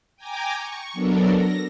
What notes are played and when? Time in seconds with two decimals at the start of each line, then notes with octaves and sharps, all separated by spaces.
0.16 G5 G#5 A#5 D6
0.55 C#6
0.93 F#3 B3 D4 A4 A#4
1.36 A#6